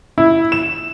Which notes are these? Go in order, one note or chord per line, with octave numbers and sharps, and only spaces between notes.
E4
E7